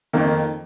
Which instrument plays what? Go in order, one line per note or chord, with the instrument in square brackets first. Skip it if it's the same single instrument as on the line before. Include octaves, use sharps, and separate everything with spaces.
[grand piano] F2 D#3 A#3